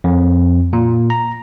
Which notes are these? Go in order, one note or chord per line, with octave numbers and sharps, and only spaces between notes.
F2
A#2
A#5